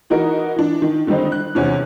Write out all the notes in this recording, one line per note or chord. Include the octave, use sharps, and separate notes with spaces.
E3 D#4 F#4 A#4
E3 D4
D#3
D3 D#3 G3 C4 D#4
F#6
E2 C3 C#4 D4